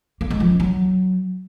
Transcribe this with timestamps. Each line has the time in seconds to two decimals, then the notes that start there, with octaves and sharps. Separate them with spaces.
0.21 A#3
0.30 G#3
0.40 F3
0.50 C#4
0.60 F#3